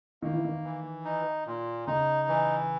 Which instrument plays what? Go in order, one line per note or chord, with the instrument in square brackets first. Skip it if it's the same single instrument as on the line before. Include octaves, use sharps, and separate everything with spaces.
[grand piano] D#3 [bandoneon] A#3
[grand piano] E3
D#3
[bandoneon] E3
D#4
A#2
[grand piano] C#3 [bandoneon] D#4
[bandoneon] E3